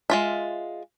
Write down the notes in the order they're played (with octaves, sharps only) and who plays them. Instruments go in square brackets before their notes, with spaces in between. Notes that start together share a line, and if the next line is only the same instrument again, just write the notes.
[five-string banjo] G#3 F4 E5